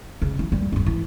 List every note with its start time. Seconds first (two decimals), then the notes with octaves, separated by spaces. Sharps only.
0.22 C#3
0.39 E3
0.52 D#2 G3
0.72 G#1 G2
0.86 E3